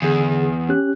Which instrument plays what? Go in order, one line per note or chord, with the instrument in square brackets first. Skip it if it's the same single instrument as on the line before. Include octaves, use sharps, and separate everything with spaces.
[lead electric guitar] E2 [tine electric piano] D3 G#4
[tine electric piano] C#4 G4 F#6